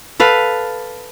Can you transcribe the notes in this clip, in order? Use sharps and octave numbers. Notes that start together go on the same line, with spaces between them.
A4 B4 F5